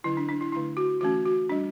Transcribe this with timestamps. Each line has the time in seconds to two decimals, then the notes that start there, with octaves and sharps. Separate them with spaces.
0.04 D3 F#3 C#4 E4
0.17 D4
0.29 D4
0.41 E4
0.52 D3 A3 D4 E4
0.77 F#4
1.01 E3 A3 C#4 F#4
1.26 F#4
1.49 G3 D4